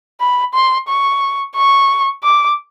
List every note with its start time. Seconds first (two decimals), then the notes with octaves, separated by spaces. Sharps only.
0.20 B5
0.54 C6
0.88 C#6
1.56 C#6
2.23 D6